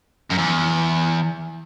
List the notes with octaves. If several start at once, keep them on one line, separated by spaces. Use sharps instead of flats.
F#2
E2